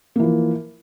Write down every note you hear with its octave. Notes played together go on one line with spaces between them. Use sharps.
E3 F3 A#3